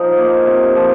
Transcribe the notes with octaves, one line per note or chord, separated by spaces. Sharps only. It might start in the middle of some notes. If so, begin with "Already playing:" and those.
Already playing: F3 D#4
A#3
C3
F3